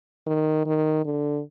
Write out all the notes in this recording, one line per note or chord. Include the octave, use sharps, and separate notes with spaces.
D#3
D#3
D3